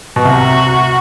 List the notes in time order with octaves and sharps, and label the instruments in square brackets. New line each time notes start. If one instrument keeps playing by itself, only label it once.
[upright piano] B2
[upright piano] C2 C3 [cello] F#4